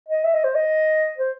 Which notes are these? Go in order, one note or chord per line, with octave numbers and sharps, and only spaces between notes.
D#5
E5
D#5
C5
D#5
C5